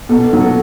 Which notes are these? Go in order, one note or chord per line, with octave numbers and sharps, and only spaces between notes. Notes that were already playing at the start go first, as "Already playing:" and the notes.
B2 A4
F#3
A4